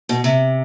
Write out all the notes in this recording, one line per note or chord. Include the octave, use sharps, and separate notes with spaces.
B2
C3